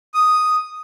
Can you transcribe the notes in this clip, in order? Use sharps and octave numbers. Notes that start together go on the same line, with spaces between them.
D#6